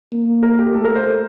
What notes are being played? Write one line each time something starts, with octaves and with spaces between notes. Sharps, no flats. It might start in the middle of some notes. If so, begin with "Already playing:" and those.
A#3
A#4
G4
A3 A4
A#4
C5